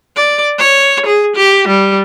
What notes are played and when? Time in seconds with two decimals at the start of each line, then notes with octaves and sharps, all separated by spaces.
0.16 D5
0.58 C#5
1.06 G#4
1.36 G4
1.68 G3